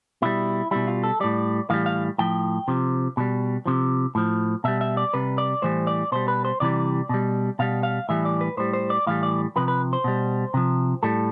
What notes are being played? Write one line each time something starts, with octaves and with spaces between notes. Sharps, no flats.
B2 G3 E4
B2 G3 E4
F4
A4
A2 G3 D5
A2 E3 G3 F5
F5
A2 F3 G5
C3 F3
B2 G3
C3 F3
A2 F3
B2 G3 E5
E5
D5
C3 G3 B4
D5
A2 E3 G3 C5
D5
B2 G3 C5
B4
C5
C3 E3 G3 D5
B2 G3
B2 G3 F5
F5
A2 E3 G3 E5
D5
B4
A2 G3 C5
C5
D5
A2 E3 G3 F5
D5
C3 F3 B4
B4
C5
B2 G3
C3 F3
A2 G3 A4